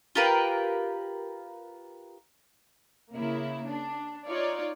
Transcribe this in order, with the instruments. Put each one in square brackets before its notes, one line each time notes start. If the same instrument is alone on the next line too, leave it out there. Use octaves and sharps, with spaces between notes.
[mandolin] F4 G4 A#4 B4
[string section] C#3 A#3 E4
D4
D#4 F4 C#5 D5